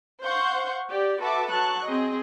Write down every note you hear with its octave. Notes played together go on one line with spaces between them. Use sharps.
C5 F5 F#5 C6 C#6 G6
G4 D5
F#4 A4 B4 E5 A5 D6
F#3 A5 C#6 F#6
C4 G#4 D#5